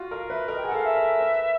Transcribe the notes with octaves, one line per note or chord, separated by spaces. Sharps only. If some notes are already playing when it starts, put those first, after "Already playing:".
Already playing: F4 F#4
A#4 F5
B4 E5
A#4 D#5
G5
G#4 F#5
A4 F5
E5
A#4
B4